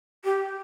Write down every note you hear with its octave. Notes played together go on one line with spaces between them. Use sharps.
G4